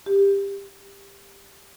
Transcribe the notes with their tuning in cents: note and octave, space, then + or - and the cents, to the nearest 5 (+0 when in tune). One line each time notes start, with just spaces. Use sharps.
G4 +15